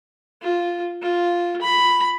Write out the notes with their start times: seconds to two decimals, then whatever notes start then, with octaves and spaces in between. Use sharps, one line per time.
0.42 F4
1.02 F4
1.62 B5